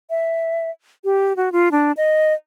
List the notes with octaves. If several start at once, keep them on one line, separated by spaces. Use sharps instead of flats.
E5
G4
F#4
F4
D4
D#5